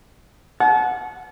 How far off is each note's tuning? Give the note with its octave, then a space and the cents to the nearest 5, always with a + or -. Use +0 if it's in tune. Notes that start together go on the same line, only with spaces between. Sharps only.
F#5 -10 A5 -40